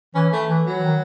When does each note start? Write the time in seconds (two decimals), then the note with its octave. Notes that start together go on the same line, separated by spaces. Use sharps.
0.15 E3 C#4
0.33 A3
0.50 E3
0.66 F#3
0.79 E3
0.83 D#3